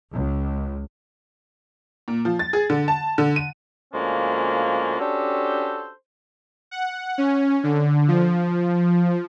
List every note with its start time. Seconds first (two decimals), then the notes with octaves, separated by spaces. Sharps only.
0.14 C#2
2.08 A#2
2.25 F3
2.39 A6
2.53 G#4
2.70 D3
2.88 A5
3.18 D3
3.36 D#7
3.93 D2 F3 G#3 A#3 C#4 D4
4.99 C#4 D4 F#4 G4 A4 C5
6.71 F#5
7.18 C#4
7.64 D3
8.08 F3